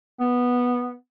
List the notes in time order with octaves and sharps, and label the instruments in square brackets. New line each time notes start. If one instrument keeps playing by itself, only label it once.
[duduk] B3